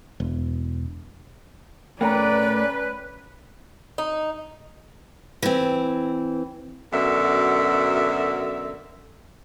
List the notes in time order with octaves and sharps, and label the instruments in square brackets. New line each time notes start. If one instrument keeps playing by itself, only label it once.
[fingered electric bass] E1
[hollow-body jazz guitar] A2 A3 A#3 [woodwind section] C#4 B4 [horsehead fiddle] D5 [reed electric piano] G5 A#5
[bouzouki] D#4
[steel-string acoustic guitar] E3 C4
[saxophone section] F#2 B2 D3 A#4 E5